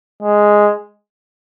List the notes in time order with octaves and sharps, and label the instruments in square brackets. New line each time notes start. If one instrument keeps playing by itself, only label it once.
[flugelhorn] G#3